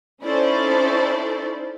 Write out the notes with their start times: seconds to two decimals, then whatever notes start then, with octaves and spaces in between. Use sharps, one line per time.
0.23 C#4 D#4 E4 A4 C5 D5